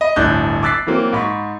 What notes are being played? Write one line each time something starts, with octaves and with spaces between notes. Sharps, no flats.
D#5 B5
D1 G1 A2 D4 F#6 G6
D6 E6 F#6 A6 B6 C7
E3 F#3 A#3 C4
G#2 B5 C#6